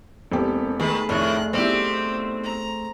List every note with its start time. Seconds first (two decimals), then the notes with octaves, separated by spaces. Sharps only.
0.32 E1 A#3 C4 G4 A4
0.80 D#3 A3 G#4 B4 A5
1.09 F1 A2 D#3 F#6
1.53 B1 G3 C4 E4 G4
2.43 A#5